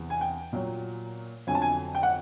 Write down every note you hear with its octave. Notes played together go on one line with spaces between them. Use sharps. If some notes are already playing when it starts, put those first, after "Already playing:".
Already playing: E2 C3 E3
G#5
G5
A#2 F#3
F2 D3 F#3 G#5
A5
G#5
G5
F#5